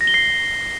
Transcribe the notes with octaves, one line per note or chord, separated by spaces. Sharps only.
A#6
G7
C7